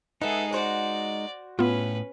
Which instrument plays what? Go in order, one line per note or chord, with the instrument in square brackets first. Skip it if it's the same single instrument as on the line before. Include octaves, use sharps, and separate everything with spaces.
[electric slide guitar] G#3 D#4 [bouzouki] B3 E5 [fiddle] G#4 A4
[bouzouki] F#4 C5 [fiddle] D5
[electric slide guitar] A2 [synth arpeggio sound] B3 F4 [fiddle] C#4 B4